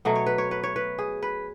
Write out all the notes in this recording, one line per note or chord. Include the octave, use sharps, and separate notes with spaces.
B2 F#3 A3
C#5
B4
C#5
B4
C#5
B4
G#4
B4